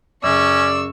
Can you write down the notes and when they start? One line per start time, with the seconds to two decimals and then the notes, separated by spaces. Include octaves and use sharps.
0.24 F#2 C#3 C#4 D5 C#6 E6